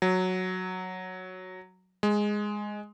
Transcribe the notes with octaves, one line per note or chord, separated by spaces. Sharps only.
F#3
G#3